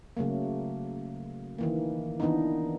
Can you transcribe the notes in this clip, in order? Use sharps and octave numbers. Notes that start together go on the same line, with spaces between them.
C#3 F#3 A3 A#3
D#3 E3 A#3
D#3 E3 B3 D4 D#4